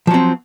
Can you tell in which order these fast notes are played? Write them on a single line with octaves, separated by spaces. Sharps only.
F3 F#3 C4